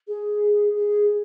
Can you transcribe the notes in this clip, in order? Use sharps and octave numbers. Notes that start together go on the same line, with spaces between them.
G#4
G#4